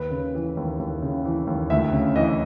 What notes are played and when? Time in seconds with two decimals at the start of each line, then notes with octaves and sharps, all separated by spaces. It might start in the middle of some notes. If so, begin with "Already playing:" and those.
Already playing: D#2 B4
0.11 C#3
0.35 E3
0.57 D#2
0.79 D#2
1.02 C#3
1.25 E3
1.47 D#2
1.70 D2 E5
1.92 C#3
2.16 E3 D#5